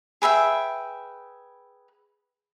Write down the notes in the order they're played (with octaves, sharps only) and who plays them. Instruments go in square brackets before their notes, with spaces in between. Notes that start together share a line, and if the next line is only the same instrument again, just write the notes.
[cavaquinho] G#4 B4 E5 G5